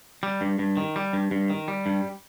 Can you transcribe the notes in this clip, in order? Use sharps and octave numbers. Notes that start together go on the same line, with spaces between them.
G3
G2
G2
D#3
G3
G2
G2
D#3
G3
G2